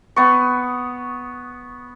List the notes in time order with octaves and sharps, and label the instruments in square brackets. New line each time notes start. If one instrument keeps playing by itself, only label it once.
[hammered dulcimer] B3 C#6